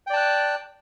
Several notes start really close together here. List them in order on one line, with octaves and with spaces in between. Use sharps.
G5 D5 A5 F#6